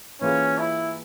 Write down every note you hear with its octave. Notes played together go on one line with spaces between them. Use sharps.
E3 A#3 C#4 F4 G#4
E4